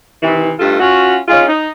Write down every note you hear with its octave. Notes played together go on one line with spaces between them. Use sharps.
C3 D#3 E3
G2 A3 D#4 F4 A4
C#4 F4 F#4
G#3 C#4 D#4 F4
D#4